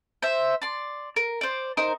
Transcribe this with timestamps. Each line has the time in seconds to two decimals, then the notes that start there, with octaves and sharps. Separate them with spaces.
0.22 C5 E5
0.62 D5 C6
1.16 A#4
1.41 C5 D5
1.77 D#4 A#4 C5